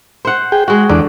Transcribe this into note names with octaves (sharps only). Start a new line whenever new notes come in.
C5 F#5
G#4 G5
G#3 F#4 F#5
E2 D3 D5